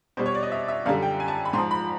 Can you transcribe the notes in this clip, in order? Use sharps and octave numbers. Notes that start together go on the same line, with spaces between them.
B2 G3 C5
C#5
D5
D#5
E5
E5
F#2 D3 G3 F5
G5
G#5
A5
B5
G#2 F3 C6
B5